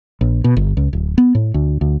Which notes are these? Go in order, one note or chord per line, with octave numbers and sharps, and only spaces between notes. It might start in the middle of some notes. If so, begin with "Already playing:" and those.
A#1
B2
G1
C#2
D1
B3
A2
D2
D2